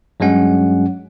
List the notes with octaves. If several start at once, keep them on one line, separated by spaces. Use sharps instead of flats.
G2 F#3 G#3 C#4 F#5